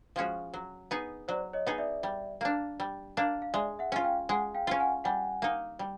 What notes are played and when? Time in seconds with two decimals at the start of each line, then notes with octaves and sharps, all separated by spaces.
0.16 F3 G#3 C#4 F#4
0.54 F#3
0.91 B3 D#4 G#4
1.28 F#3 C5 D5
1.53 C#5 D#5
1.67 B3 D#4 G#4
1.78 D5 E5
2.03 G3
2.41 A#3 D4
2.80 G3
3.17 A#3 D4
3.42 F5
3.54 G#3 D5 E5
3.79 E5 F#5
3.92 C#4 F4
4.04 F5 G5
4.29 G#3 F#5 G#5
4.54 F5 G5
4.67 C#4 F4
4.80 F#5 G#5
5.04 G3 F#5 G#5
5.42 A#3 D#4
5.79 G3